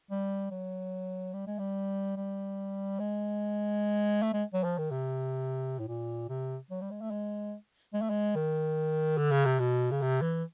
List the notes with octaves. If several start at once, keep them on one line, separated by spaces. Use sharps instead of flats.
G3
F#3
G3
G#3
G3
G3
G#3
A3
G#3
F#3
F3
D#3
C3
A2
A#2
C3
F#3
G3
G#3
A3
G#3
G#3
A3
G#3
D#3
D3
C#3
C3
B2
C#3
C3
E3